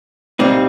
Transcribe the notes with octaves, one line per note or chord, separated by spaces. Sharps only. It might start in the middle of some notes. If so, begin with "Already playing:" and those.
C2 A#2 G3 C4 D#4